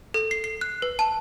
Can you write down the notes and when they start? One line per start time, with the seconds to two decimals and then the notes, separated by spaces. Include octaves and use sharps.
0.14 A4
0.31 C7
0.44 C7
0.61 F#6
0.82 B4
0.99 A5